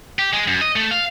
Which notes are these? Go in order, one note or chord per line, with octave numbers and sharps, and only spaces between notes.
G4
G#3
F#2
D#5
A3
F5